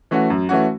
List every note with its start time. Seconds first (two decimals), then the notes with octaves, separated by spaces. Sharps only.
0.11 E3 A3 C#4 F#4
0.30 F#2
0.49 E3 A3 C#4 F#4